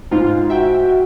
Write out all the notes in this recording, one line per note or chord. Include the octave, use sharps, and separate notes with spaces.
G#2 F4
F#4 E5 G5